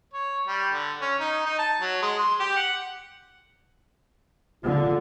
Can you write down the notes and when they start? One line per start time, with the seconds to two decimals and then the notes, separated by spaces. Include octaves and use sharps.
0.13 C#5
0.47 G3
0.72 D3
1.01 C#4
1.20 D#4
1.45 D#4
1.58 A5
1.82 F#3
2.02 G#3
2.18 C6
2.40 G4
2.56 F#5
4.64 D3 F4